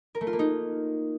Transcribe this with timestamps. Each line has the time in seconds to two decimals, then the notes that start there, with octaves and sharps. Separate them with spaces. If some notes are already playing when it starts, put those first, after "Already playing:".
0.15 A#4
0.21 A3
0.27 F4
0.33 A#3
0.39 D#4